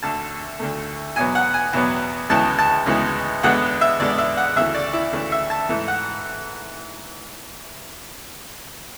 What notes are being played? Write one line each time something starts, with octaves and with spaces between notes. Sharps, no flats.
D2 D3 A3 A5
D2 D3 A3
E2 B2 F#3 B3 G#5
F#5
G#5
E2 B2 F#3 B3
D2 C#3 E3 G#3 B3 A5
A5
D2 C#3 E3 G#3 B3
E2 D3 G#3 B3 F#5
E5
E2 D3 G#3 B3 D5
E5
F#5
D2 C#3 E3 A3 E5
D5
E4
D2 C#3 E3 A3
E5
A5
G#2 E3 A3
F#5